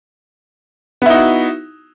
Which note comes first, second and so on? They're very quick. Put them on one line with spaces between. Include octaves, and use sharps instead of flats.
B3 E4 D#4 F#4